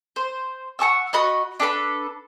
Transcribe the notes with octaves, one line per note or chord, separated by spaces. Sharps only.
C5
F#5 A5 C#6 E6
F#4 D#5 B5 C#6
D4 A4 B4 B5